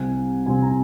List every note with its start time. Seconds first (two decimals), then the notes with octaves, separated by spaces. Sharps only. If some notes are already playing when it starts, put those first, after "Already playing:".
Already playing: C2 C3 G3 C4 G#5
0.46 C2 C3 G3 C4 G#5
0.62 A#5